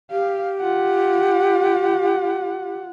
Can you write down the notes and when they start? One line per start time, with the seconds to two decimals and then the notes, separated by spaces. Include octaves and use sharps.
0.11 G4 F5
0.61 F4 F#5